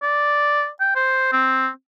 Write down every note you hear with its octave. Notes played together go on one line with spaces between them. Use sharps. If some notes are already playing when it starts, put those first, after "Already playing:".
D5
G5
C5
C4